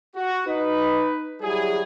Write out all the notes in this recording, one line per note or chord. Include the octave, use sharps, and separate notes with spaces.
F#4
D#4 B4
F#3 G3 E4 G4 G#4